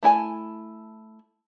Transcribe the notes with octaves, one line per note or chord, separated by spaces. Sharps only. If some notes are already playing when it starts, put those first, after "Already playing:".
A3 E4 G#5 A5